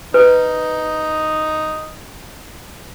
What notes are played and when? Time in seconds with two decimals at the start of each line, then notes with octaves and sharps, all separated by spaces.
0.14 D#4 B4